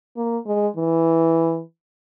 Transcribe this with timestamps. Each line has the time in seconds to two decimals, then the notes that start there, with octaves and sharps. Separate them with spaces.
0.17 A#3
0.46 G#3
0.76 E3